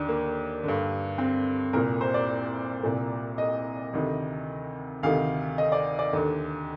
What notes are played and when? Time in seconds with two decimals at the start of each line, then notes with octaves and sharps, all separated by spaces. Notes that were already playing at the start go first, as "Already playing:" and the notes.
Already playing: D#2 D3 D4
0.09 A#3
0.64 G2 D3
1.18 C4
1.73 C2 A#2 A#4
2.01 C5
2.14 D5
2.83 C2 A#2
3.38 D#5
3.93 D2 C3 D#3
5.03 D2 C3 D#3 F5
5.58 D#5
5.72 D5
5.99 D5
6.13 D#2 D3